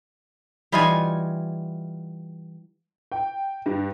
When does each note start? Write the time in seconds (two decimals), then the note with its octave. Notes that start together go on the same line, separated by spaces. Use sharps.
0.72 E3 G3 D#4 F4 F#4 G#5
3.12 G5
3.66 G2